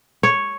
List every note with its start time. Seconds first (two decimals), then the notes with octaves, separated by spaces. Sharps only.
0.23 C#5